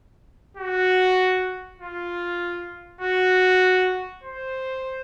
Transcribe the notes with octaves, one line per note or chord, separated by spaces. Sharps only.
F#4
F4
F#4
C5